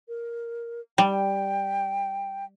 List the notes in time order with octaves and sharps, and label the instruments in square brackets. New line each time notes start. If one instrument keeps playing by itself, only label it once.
[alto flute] A#4
[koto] G3 [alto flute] G5